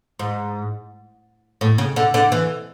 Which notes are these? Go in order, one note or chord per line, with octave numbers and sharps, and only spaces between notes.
G#2
A2
C#3
D3
D3
E3